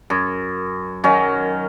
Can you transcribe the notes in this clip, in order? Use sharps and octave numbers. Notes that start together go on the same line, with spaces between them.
F#2
D#3 F#3 C#4